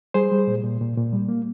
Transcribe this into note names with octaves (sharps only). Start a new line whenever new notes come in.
G3 G#4 C5
G3
A#2
A#2
A#2
A#2
G3
A#3